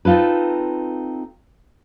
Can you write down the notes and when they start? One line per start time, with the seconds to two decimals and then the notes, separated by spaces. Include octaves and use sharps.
0.05 C4 D#4 F4 A4 B4